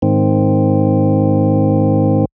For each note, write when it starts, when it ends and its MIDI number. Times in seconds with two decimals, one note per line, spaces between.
0.02 2.25 44
0.02 2.25 51
0.02 2.25 60